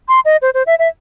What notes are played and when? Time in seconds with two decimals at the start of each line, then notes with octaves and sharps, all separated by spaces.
0.08 C6
0.25 D#5
0.42 C5
0.54 C5
0.67 E5
0.79 E5